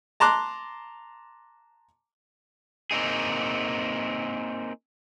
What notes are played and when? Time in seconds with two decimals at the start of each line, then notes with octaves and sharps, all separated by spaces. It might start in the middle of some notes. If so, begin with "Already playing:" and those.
0.20 A5 A#5 C6 D6 F#6
2.91 A#3 C4 D#4 G#4